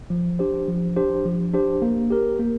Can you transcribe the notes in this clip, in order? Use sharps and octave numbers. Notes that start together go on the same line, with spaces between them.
F3
D4 G4 C5
F3
D4 G4 C5
F3
D4 G4 C5
A#3
G4 A#4
A#3